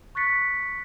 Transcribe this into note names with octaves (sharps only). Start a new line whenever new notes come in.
C#6 F#6 A6 B6 C#7